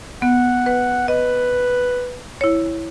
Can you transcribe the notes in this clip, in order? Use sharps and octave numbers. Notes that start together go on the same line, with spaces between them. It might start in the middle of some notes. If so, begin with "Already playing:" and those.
B3 F#5
B4
B4 D#5
E4 C#5